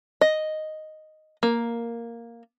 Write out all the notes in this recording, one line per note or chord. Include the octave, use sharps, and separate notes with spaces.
D#5
A#3